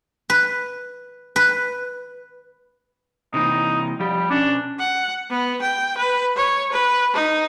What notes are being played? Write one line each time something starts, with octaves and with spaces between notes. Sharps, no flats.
B4
B4
C3 E3 A#3 D#4
F3 G3 G4
B2 C#4 D4
F#5
B3
G5
B4
C#5
B4
D#4